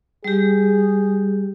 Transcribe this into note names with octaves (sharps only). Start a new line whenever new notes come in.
G3 G4 G#4